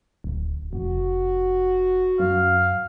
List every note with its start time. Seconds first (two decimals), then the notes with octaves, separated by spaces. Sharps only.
0.24 D1
0.73 F1 F#4
2.19 F#2 F5